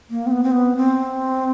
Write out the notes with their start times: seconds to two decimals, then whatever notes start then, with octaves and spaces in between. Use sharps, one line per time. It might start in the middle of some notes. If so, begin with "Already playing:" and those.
0.10 A#3
0.26 C4
0.31 B3
0.44 C4
0.52 B3
0.77 C4